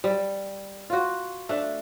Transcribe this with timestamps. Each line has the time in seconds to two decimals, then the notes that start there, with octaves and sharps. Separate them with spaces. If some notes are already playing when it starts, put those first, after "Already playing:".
0.04 G3
0.90 F4 F#4
1.49 A3 D4